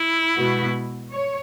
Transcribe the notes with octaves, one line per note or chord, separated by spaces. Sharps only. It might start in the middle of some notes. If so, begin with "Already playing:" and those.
Already playing: E4
B2 G#3 B3 F#4 B4
C#5